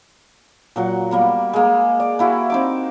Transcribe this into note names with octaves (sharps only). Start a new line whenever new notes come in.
A#2 F#3 F#5
G3 A#3 B3
G#3 A#3
D5
A#3 E4 F#4 G4
C4 D#4 D6